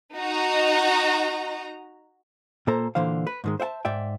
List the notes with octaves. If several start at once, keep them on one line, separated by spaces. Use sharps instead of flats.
D#4 F#4 D#5 A#5
A#2 A#3 A4 C5 A#5
A#2 D3 E3 C5 F5
B4
G#2 D#3 G#3
C5 E5 F#5 A5
G#2 D5 E5 G5